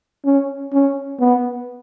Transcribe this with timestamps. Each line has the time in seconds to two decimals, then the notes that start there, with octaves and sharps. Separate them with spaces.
0.25 C#4
0.73 C#4
1.20 B3